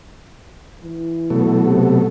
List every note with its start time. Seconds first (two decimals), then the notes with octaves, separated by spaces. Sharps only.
0.84 E3
1.30 B2 F#3 A3
1.65 C3